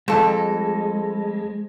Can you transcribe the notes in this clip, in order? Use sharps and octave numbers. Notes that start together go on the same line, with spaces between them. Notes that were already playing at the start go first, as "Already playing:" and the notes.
F2 G#3 A4